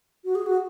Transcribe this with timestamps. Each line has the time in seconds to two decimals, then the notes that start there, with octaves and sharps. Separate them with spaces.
0.24 F#4
0.35 G#4
0.46 F#4